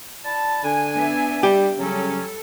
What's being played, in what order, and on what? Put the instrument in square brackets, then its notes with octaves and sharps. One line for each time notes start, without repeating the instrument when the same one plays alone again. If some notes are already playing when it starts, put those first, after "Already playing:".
[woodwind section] E4 D5 A5
[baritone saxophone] D3 [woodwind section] G#5
[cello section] B3 D4 E5
[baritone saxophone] G3 [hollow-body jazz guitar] G4
[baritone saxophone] C#3 [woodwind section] F#3 C#4 [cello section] G3 A4